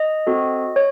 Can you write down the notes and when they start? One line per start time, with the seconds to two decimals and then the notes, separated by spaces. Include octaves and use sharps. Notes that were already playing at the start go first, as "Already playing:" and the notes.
Already playing: D#5
0.27 C4 F#4 A4
0.76 C#5